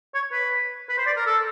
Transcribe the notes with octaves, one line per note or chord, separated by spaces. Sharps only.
C#5
B4
B4
C5
D5
A#4
A4